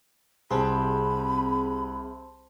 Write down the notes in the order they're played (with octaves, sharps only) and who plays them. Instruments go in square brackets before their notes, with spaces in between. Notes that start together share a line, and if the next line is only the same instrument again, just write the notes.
[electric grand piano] C2 C3 [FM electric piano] C4 G#4 [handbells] C5 A5 C6 [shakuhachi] B5